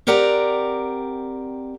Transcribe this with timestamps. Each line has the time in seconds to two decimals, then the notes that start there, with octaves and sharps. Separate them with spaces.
0.07 C4 G4 A#4 D5 F#5 A#5